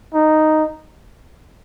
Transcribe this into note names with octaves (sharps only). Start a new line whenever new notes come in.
D#4